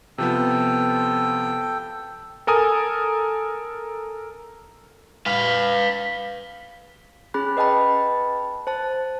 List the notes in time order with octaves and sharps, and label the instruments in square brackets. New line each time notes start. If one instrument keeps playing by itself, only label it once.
[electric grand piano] C3 F3 B3 [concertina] A4 G5
[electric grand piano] A4 A#4 G#5 D#6
[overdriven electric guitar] B4 F5
[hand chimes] C#4 G#4 B5 F#6
B4 D#5 G5 A5 B5
C5 A5